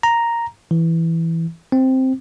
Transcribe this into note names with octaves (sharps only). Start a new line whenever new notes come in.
A#5
E3
C4